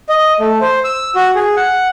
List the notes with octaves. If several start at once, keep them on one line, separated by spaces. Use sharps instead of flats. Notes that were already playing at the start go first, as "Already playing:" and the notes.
D#5
A3
C5
E6
F#4
G#4
F#5